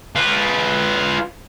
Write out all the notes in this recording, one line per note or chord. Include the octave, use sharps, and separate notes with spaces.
F4 B4